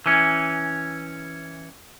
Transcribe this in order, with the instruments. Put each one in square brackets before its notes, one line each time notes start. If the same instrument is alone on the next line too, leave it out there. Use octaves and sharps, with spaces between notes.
[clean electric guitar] E3 C#4